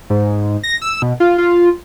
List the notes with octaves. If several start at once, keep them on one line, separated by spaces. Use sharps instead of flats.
G#2
A#6
E6
B2
F4
F4